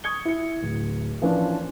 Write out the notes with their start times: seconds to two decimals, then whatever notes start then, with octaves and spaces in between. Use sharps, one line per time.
0.04 C#6 D#6 G#6 C#7 G7
0.25 E4 C#7
0.63 D1
1.22 E3 F3 A#3 C#4 D4